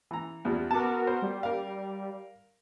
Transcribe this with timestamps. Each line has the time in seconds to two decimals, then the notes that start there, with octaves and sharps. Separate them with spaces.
0.11 E3 A#5
0.45 E2 F3 G3
0.71 B3 F#4 A#4 A5 D6
1.07 C5
1.22 G3
1.43 A#4 F5